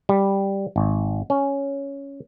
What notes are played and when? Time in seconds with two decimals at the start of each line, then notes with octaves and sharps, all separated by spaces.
0.09 G3
0.76 G#1
1.30 C#4